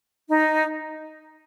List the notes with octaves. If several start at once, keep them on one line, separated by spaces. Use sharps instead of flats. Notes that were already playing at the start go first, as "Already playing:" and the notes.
D#4